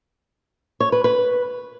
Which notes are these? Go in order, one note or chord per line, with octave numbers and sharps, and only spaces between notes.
C#5
B4
B4